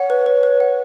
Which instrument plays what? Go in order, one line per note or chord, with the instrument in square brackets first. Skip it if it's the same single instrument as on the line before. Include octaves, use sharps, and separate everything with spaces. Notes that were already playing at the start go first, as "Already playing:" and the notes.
Already playing: [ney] C#5 [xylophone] F#5
[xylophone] B4
B4
B4
F#5